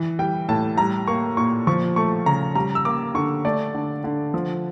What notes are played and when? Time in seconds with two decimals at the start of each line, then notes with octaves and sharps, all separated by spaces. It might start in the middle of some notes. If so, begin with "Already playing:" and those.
Already playing: E3
0.19 G3 G5
0.49 A2 A5
0.78 G3 A#5
1.07 A#3 C#6
1.37 A#2 C#6
1.67 F3 C#6
1.96 A3 C#6
2.26 C#3 A#5
2.55 G3 A#5
2.75 E6
2.85 A#3 D6
3.15 D3 C#6
3.45 A3 D5
3.74 D3
4.04 D3
4.34 F3